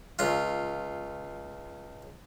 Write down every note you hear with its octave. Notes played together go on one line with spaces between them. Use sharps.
C#2 F4